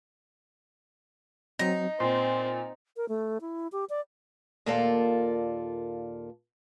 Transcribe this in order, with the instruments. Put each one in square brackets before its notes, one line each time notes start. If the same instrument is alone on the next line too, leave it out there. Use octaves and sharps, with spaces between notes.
[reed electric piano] F#3 C4 [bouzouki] D#4 [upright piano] A#6
[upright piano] A#2 [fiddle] C4 [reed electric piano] C6
[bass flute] A#4
A3
E4
G4
D5
[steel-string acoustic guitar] D#2 A#2 A#3 F4 A4 D5